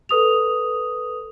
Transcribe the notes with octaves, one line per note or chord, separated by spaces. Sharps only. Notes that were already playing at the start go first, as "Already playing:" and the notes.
A4 B4 D#6 F7